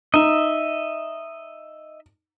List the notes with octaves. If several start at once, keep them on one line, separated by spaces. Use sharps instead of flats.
D#4 D#5 E5